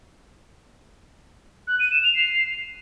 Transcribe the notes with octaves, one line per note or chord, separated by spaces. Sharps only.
F#6
D#7
E7
F7
C7